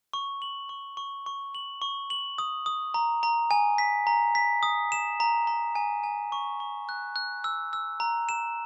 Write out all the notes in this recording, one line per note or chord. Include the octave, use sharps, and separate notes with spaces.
C#6
F#7
C#6
C#6
C#6
F#7
C#6
F#7
D#6
D#6
A#5
A#5
G#5
B6
A#5
B6
D#6
E7
A#5
A#5
G#5
G#5
C#6
C#6
F#6
F#6
E6
E6
A#5
E7